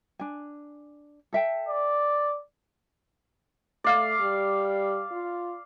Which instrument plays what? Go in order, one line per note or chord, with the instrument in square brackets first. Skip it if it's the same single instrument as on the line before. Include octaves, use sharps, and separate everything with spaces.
[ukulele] D4 G#5
A4 E5 G5
[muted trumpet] D5
[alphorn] A3 [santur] D5 F5
[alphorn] G3
F4